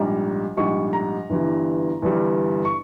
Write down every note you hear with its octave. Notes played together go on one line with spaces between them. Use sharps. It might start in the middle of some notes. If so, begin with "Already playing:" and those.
Already playing: A#1 G#2 G3 A#5
A#1 G#2 G3 C#6
A#5
G1 G2 E3 G3
G1 G2 E3 G3
C#6